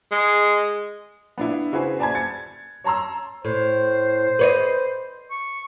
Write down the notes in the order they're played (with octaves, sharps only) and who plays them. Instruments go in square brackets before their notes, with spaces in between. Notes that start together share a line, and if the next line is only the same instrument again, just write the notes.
[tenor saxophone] G#3
[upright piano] B3 D4 E4
C#3 E4 F#4 G#4 B4 C5
C5 D5 G#5 A5 B5 G#6
G#6 A6 C#7
C#5 A5 A#5 C6 E6
[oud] A2 [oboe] C5
[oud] B4 C#5 D#5
[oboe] C#6